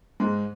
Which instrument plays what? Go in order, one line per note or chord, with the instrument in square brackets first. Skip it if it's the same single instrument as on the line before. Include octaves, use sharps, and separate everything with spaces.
[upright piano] G#2 G#3